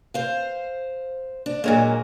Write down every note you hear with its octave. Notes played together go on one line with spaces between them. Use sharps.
C5 F5
D4
A#2 F#3 G#3 A#3